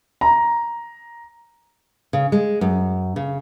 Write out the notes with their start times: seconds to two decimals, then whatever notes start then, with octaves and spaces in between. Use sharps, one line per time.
0.21 A#5
2.13 C#3
2.32 G#3
2.61 F#2
3.16 C#3